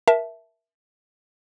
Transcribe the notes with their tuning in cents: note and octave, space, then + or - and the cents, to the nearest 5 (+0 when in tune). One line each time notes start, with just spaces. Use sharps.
A#4 +20 E5 +0 A5 -10